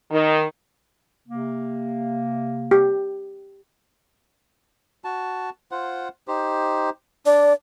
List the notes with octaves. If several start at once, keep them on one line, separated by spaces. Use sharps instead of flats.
D#3
C3 A#3
G4
F#4 A5
F4 C5 F#5
D#4 G4 C5
D4 D5